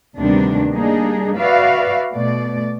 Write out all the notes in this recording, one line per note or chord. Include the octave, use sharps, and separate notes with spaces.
D2 C3 D#3 G3 B3 D4
G3 A#3 D4 D#4 G#4
F#4 B4 D5 E5 F5
B2 A3 D5